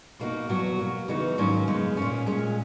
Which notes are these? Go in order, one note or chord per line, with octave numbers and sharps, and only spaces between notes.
B2 A#3 D#4 F#4
E2 B2 F#3 B3 F#4
B2 F#3 A#3
C#3 E3 B3 D#4 F#4
G#2 D#3 F#3 A#3 C#4
F#2 C#3 G#3 B3 D#4
A#2 A#3 C#4
A#2 G#3 C#4